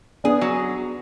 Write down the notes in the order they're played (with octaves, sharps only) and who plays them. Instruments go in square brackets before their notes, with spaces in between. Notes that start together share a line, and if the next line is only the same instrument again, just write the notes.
[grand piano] B3 D4 [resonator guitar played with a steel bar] G#4
[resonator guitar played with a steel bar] F#3